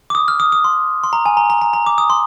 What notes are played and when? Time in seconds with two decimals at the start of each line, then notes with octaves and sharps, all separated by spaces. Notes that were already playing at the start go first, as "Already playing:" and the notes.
0.10 D6
0.15 D#6
0.28 F6
0.40 D#6
0.52 D#6
0.64 C6
1.04 C6
1.13 A#5
1.26 G#5
1.37 A#5
1.50 A#5
1.62 A#5
1.73 A#5
1.86 D6
1.98 D#6
2.10 C6